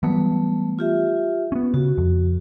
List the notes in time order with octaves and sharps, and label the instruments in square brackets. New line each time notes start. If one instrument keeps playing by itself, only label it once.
[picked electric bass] E3 F#3 B3 [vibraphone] G3 A3
[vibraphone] F4 G4 E5
[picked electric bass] B3 C#4
[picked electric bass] C#3 [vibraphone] F#4
[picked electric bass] F2